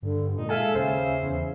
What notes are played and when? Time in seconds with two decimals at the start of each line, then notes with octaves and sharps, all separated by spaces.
0.02 G2 D3
0.21 G2
0.37 A#2 G#3 D#4
0.49 A4 E5 F5 G#5
0.75 D#2 C#3 C5
1.23 E2